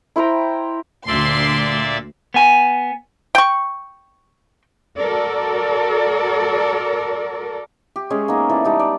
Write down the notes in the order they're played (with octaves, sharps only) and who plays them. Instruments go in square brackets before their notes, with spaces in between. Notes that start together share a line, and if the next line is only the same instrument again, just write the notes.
[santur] E4 C5 G5 A#5
[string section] D2 C6 [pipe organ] A#2 D5 E5
[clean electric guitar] B3 G#5
[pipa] G5 C#6
[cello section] F#4 A4 A#4 D5
[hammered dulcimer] G4
G#3 C#4 G#4 C#5
A#3 B3 D#4
E3 A4 D5
G3 D#4 A4
D5